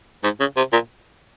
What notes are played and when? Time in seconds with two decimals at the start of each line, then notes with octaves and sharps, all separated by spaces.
0.24 G#2
0.40 C#3
0.57 C3
0.73 A#2